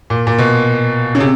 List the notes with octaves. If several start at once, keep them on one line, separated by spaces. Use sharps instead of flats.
A#2
A#2
B2
C#3
C3